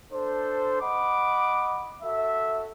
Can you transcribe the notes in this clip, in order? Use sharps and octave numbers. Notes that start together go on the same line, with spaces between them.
D4 A4 C5
D#5 F#5 B5 D6
F#4 A4 E5